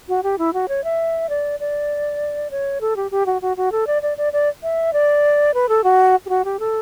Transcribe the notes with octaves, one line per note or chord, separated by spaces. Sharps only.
F#4
G4
E4
F#4
C#5
E5
D5
D5
C#5
A4
G4
G4
F#4
F#4
F#4
A4
D5
D5
D5
D5
E5
D5
B4
A4
F#4
G4
F#4
G4
A4